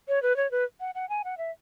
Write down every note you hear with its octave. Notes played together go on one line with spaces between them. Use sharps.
C#5
B4
C#5
B4
F#5
F#5
G#5
F#5
E5